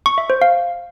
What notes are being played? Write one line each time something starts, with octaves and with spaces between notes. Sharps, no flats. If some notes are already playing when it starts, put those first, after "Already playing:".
C#6
E5
C5
F5